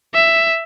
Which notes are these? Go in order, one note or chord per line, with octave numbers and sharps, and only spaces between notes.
E5